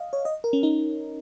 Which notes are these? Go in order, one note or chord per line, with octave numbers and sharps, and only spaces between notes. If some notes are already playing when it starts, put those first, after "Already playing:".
Already playing: D#5 F5
C#5
D#5
A#4
C#4
D#4